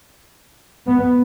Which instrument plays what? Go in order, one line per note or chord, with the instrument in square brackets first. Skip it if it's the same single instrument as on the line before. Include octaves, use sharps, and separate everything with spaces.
[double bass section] B3